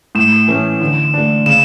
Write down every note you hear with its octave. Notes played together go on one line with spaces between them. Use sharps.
A2 E7
E3 A3 C#4
D3
A3 D4
C#3 E7